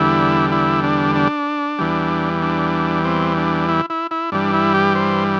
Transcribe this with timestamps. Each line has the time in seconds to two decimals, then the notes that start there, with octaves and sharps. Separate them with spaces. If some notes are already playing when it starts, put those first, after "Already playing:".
Already playing: E2 D3 G3 E4
0.52 E4
0.84 D4
1.15 D4
1.79 E2 E3 G3
2.42 D4
3.05 C4
3.37 D4
3.69 E4
3.90 E4
4.11 E4
4.32 G2 E3 G3 D4
4.54 E4
4.74 G4
4.95 C5